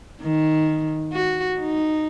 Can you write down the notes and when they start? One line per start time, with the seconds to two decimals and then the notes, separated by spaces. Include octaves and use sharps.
0.21 D#3
1.12 F#4
1.59 D#4